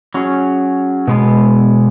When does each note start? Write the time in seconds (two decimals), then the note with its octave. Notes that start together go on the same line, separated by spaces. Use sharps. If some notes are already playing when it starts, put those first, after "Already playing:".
0.14 F#3 C#4 G#4
1.08 B2 G#3 B3